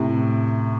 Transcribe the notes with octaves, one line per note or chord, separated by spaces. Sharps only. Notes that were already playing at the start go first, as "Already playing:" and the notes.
Already playing: A2 C3